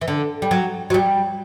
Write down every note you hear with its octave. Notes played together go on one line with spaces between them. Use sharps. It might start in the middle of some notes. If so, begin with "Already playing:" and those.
E3
D3
G3
F#3
F#3
G3